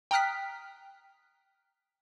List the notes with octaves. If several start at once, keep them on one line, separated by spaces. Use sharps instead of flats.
G5 A#5 D#6 F6 F#6 B6